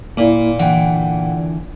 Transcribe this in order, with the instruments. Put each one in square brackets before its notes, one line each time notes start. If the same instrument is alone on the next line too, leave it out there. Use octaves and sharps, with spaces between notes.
[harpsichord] A#2 [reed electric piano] A#3 E4
[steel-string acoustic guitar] D3 E3 [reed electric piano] F#5 G5